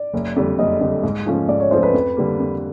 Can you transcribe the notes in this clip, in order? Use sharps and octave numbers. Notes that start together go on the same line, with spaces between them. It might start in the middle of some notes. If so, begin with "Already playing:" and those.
Already playing: D5
F#1
F2 D3 G3
F#1 D#5
F2 D3 G3
G#2
F3 A3 C#4 F4
G#2 D5
C#5
F3 A3 C#4 F4 C5
B4
F2
D3 G3 A#3
F2